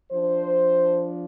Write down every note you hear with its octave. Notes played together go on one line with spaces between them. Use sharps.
F3 D4 C5